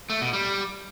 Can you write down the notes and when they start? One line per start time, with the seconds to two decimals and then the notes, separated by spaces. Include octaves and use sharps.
0.10 A3
0.21 B2
0.33 G3